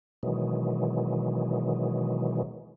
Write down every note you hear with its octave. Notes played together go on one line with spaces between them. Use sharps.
B2 D#3 E3 F#3 G#3